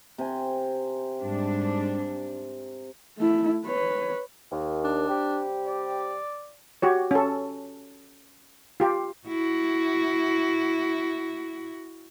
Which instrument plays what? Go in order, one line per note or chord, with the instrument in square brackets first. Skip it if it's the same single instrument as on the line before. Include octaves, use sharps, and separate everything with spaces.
[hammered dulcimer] C3 G#5
[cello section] G#2 G3 D4
[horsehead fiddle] A3 E4
B4 C#5
[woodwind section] D#2
[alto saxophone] D4
[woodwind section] C3 G3 G4
[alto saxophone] D5
[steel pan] F#4 G4 C#5
C#4 A4
F4 G4
[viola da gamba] E4 F#4